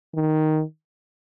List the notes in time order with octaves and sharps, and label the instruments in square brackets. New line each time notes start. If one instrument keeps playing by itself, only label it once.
[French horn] D#3